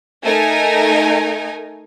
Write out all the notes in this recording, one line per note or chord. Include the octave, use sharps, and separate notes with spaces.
A3 D#4 A#4 G#5